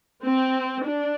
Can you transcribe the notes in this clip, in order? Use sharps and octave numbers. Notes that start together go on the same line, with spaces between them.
C4
D4